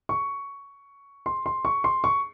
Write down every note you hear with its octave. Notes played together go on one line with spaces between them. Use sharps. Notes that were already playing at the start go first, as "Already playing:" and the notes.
C#6
C6
C6
C#6
C6
C#6